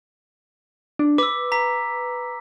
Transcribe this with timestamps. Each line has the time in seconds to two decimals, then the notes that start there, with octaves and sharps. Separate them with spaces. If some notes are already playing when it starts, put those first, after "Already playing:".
0.99 D4
1.18 B4 D6 E6
1.52 A#5 B6